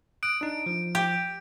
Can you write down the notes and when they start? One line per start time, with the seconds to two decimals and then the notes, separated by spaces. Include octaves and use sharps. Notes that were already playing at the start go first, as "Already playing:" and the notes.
0.23 D#6 F#6 D7
0.41 D4 D#4
0.66 F3
0.95 G4